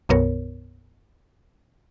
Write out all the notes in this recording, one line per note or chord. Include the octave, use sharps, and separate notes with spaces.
B1 F#2 B2 B3 A#4 C#5